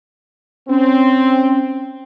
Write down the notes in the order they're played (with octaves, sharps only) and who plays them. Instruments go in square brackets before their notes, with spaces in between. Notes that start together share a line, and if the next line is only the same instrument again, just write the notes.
[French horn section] C4 [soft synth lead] C#4